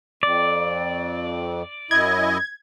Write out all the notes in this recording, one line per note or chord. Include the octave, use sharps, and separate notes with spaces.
F2 D5
F#2 E4 D#5 G#6